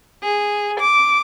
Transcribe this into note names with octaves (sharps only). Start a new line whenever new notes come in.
G#4
D6